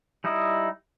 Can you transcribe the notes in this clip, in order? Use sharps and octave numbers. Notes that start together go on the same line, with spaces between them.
G3 D#4 E4 D#6